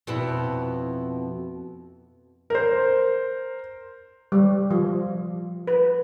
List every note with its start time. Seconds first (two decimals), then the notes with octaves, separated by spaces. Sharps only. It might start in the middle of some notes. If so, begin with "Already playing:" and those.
0.07 F2 B2 E4
2.50 A#4 C5
4.32 G3
4.71 F3
5.67 B4